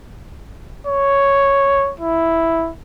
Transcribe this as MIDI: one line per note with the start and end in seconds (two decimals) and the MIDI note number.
0.87 1.93 73
2.00 2.72 64